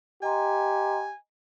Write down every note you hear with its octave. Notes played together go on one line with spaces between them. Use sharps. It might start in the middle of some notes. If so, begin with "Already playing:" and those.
G4 D#5 G#5 A#5 C6